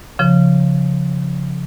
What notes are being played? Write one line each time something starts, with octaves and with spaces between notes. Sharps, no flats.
C#3 F3